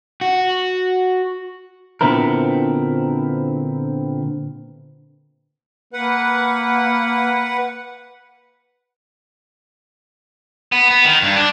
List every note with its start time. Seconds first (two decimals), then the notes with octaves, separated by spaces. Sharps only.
0.21 F#4
2.01 A#2 D3 B3 C4 E4 A#4
5.93 A#3 B4 F#5
10.72 B3
10.91 B3
11.05 D#3
11.22 G2
11.36 D4